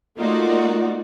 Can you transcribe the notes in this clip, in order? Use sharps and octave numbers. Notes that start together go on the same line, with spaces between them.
A3 A#3 D#4 F4 F#4 D5